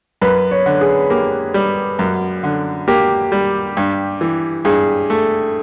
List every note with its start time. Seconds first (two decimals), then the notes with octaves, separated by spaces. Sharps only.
0.21 F#2 B4
0.51 C#5
0.66 D3
0.81 G#4
1.10 A#3 G4
1.54 G3
1.99 F#2 F#4
2.43 D3
2.88 A#3 G4
3.32 G3
3.77 G2
4.21 E3
4.65 G2 G#4
5.10 A3